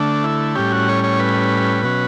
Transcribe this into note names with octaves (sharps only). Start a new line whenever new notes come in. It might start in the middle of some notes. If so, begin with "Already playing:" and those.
Already playing: D3 A3 D4
E4
A2 G3 C#4 G4
F#4
C#5
C#5
B4
B2 F#3 C#4